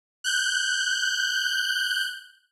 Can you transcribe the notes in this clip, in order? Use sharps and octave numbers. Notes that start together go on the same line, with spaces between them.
F#6 G6